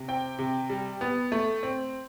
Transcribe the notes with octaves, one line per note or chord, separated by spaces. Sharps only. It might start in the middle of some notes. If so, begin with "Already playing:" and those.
Already playing: C3
C4 G5
C3
G3
B3
A3
C4